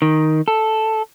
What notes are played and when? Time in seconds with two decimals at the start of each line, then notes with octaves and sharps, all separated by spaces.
0.02 D#3
0.48 A4